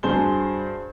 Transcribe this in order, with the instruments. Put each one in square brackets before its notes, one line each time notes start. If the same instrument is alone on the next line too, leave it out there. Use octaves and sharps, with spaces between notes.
[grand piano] G2 F#4 G#4 C5 A5 G7